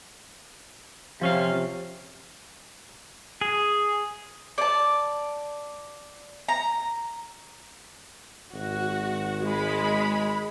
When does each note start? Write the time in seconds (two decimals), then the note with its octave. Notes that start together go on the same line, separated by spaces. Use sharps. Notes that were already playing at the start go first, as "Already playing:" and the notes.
1.21 C3 F3 C#4 F5
3.41 G#4
4.58 D5 A5
6.48 A#5
8.54 G#1 F#4
9.43 G#3 B5